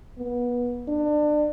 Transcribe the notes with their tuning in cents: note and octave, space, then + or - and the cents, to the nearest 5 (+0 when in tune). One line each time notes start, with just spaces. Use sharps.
B3 -25
D4 +30